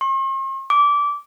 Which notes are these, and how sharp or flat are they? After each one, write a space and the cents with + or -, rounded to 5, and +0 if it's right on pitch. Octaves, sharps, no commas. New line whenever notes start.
C6 +45
D6 -20